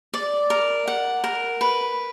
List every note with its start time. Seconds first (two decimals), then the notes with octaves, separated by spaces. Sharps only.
0.14 D5
0.50 A#4
0.88 F#5
1.24 A#4
1.61 B4